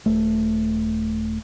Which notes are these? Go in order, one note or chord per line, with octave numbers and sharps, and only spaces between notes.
D#1 A3